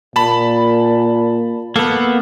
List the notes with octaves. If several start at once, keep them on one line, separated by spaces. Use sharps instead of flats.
A#2 A5 B5
A#3 B3 A4